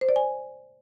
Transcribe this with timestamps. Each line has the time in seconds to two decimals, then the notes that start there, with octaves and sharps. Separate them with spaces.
0.01 C5
0.09 D5
0.16 G#5